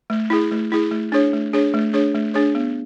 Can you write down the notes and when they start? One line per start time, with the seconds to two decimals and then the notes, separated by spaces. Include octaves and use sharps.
0.10 A3
0.30 E4 G#4
0.51 A3
0.72 E4 G#4
0.91 A3
1.12 D4 G#4 C#5
1.33 A3
1.53 D4 G#4 C#5
1.74 A3
1.93 D4 G#4 C#5
2.15 A3
2.34 D4 G#4 C#5
2.55 B3